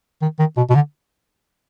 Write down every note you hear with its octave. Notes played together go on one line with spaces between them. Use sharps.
D#3
D#3
B2
B2
D3